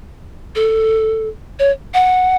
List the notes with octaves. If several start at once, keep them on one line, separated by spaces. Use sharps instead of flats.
A4
C#5
F#5